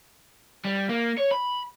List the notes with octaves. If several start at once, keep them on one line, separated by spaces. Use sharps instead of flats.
G3
A#3
C#5
B5